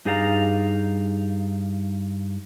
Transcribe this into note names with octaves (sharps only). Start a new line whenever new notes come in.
G2 D#4 G#4 D5 F5 A#5